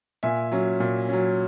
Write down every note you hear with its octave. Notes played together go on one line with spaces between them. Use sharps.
A#2 E5 G#5
F#3 C#4
A#2
F#3 C#4